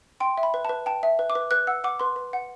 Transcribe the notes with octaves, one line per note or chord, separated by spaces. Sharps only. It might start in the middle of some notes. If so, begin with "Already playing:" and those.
G5 C6
E5
B5
B4
B4 A5
G5 A5
E5
B4
D6
B4
B4 F#6
F#5 E6
F#5 D6
B4 C6
B4
F#5